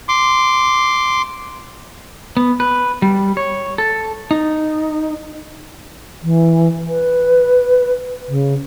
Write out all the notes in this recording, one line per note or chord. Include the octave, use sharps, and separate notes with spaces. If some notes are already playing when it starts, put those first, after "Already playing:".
C6 D6
B3
B4
G3
C#5
A4
D#4
E3
B4
C#3